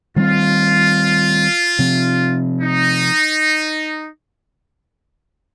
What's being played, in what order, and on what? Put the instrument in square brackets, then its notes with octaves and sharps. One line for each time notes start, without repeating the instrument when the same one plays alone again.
[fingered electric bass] D#3 G3 C4 [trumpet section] F4
[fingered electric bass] C3 F3 C4
[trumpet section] D#4